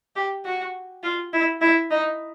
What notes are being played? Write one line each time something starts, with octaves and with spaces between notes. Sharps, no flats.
G4
F#4
F4
E4
E4
D#4